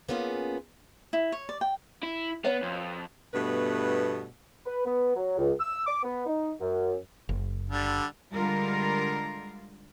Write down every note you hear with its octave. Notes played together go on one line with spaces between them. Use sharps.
A#3 B3 C#4 F4 G#4
E4
C#5
D5
G5
E4
B3 B4 C#5 F5
F2
G2 B2 A3 B3 B4
B4
B3
F#3
C#2
E6
D6
B3
D#4
F#2
F#1
D3 G3
D3 G3 G#3 F4 A#4